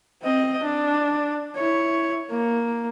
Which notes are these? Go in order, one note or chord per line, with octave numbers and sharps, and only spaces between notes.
C4 D#5
D4
E4 C#5
A#3